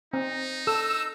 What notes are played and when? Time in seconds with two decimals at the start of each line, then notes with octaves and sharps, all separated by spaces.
0.13 C4 D#4
0.67 A4 E6